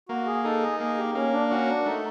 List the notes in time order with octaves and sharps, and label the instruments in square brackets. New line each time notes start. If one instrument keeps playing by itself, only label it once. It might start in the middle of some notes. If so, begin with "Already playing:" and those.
[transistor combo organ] A#3 [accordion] F#4
[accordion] G#4
[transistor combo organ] D#4 [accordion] A4
[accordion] G#4
[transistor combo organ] A#3 [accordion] G#4
[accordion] G4
[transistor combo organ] A#3 [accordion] C#4
[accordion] D4
[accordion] C#4 [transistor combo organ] F#4
[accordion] D4
[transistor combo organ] A3 [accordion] D#4